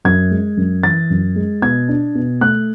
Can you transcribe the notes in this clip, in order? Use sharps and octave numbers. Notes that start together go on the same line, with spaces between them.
F#2 G#6
G#3
F#2
E3 A6
F#2
G#3
B2 G#6
D4
B2
A3 F#6